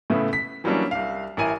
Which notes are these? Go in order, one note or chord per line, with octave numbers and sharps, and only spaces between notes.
A2 C#3 A3 B3 E4
B6
E3 F#3 G3 A#3 C#4 D4
C2 F5
A1 E4 A#4 G#5 D#7